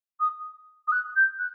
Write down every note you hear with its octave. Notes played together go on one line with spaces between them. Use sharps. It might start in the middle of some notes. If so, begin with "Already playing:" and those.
D#6
D#6
F#6
G6
F#6